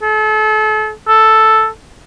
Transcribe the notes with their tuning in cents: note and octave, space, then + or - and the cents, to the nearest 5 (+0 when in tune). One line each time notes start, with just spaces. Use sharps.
A4 -35
A4 +0